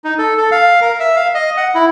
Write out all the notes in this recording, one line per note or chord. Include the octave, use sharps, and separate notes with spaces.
D#4
A4
A4
F5
A#4
E5
F5
D#5
F#5
E4